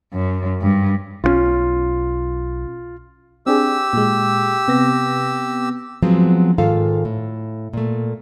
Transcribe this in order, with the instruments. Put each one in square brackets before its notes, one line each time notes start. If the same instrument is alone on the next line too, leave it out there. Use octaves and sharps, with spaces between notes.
[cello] F#2
G2
[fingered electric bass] B1 G3 C#4 [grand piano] F4
[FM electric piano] C4 D4 G#4 [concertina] G4 E6
[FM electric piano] A#2 G#3
C3 B3 A#6
[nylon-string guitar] F3 F#3 G#3 B3 C4
G#2 D#3 F4 A4 F5
A2
A#2 A3